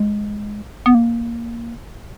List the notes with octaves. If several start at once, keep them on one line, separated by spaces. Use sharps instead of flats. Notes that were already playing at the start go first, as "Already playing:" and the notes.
Already playing: G#3
B3
A#3